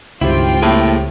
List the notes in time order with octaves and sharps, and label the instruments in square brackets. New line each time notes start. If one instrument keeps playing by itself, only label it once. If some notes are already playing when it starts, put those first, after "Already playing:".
[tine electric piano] C#2 G4 [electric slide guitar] G2 D#3 E4 [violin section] C4 F4 G5
[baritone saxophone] A2 [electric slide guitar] A#3 G#4